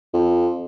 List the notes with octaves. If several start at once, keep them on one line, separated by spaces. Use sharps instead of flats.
F2